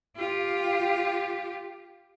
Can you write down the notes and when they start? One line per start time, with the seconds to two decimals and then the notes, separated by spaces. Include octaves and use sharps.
0.17 F4 G4